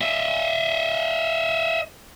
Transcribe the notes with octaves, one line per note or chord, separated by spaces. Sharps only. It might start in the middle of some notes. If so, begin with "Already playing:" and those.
D#5 E5